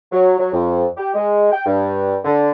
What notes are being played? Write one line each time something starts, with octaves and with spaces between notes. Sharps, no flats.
F#3
F#3
F2
G4
G#3
G5
G2
D3